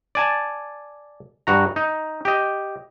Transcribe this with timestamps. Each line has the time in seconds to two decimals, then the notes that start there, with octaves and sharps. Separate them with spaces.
0.15 D5 G#5 A5
1.47 G2 F#4 A#5
1.76 D#4
2.25 G4 D#5